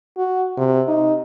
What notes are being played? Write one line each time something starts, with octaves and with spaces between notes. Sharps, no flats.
F#4
C3
D#4